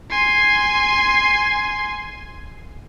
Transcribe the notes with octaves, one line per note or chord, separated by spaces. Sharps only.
G#5 C6